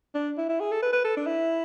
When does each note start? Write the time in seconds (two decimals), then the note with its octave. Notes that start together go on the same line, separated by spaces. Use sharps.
0.14 D4
0.38 E4
0.49 E4
0.60 G#4
0.71 A4
0.82 B4
0.93 B4
1.04 A4
1.16 D4
1.27 E4